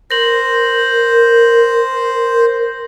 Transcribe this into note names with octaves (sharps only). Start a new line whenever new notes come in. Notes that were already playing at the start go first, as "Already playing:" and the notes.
A#4 C5 A#6 F#7